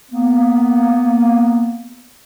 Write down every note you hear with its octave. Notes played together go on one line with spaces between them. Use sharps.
A#3 B3